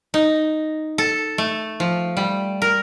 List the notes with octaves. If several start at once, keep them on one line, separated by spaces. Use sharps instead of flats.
D#4
A4
A3
F3
G3
A#4